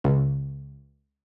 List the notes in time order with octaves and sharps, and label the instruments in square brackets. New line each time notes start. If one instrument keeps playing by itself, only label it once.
[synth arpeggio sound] C#2